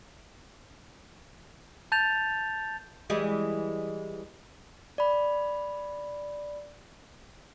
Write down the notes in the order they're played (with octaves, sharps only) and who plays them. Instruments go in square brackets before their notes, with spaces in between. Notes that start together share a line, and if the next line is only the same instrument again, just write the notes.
[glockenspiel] A5 G6 A6 F7
[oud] E3 G3 G#3
[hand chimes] D5 B5